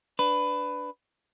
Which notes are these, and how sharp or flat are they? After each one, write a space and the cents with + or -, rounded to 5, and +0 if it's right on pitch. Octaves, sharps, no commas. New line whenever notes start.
D4 +0 B4 +15